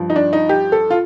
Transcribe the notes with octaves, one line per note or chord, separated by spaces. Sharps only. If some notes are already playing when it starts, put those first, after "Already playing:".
Already playing: G2 F3
D#4
D4
D#4
G4
A4
F4